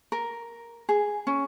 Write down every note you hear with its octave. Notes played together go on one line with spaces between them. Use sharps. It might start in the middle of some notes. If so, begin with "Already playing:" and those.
A#4
G#4
C#4